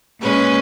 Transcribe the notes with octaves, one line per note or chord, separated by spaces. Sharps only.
A#2 G#3 C#4 B4